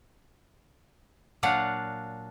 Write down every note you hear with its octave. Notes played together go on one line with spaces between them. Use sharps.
A#2 F#3 D4 F5 F#5